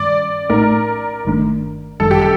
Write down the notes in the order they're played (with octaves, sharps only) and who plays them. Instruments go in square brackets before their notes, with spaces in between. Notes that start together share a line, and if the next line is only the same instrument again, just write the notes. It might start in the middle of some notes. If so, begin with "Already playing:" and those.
Already playing: [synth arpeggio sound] G2 D#3 G3 [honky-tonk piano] D5
[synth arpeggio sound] A#1 A2 A3 D#4 [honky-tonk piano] A#4
[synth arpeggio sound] G1 G2 D#3 A3 D4
[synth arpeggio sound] G1 F#2 D#3 G3 [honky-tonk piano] A4
[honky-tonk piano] G4
A4